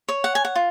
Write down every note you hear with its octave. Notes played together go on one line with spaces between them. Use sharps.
C#5
F#5
G#5
F#5
F4